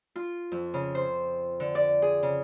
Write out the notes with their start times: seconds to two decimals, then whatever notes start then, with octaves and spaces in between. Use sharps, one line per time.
0.16 F4
0.52 F2
0.74 C#3
0.95 C5
1.60 D3
1.75 D5
2.02 G#4
2.23 C#3